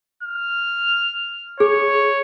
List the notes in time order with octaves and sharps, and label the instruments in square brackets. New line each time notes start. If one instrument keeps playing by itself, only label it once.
[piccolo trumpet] F6
[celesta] G#4 [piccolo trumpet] C#5